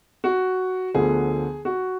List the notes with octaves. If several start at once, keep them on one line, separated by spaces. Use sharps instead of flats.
F#4
D2 D3 F3 B3 G#4
F#4